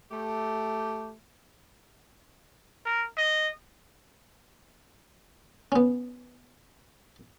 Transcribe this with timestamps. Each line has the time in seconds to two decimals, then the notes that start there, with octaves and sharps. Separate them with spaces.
0.12 A3 G4
2.86 A#4
3.18 D#5
5.72 B3 C#4